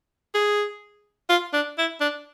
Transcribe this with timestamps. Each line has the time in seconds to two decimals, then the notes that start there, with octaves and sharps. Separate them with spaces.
0.35 G#4
1.29 F4
1.53 D4
1.78 E4
2.01 D4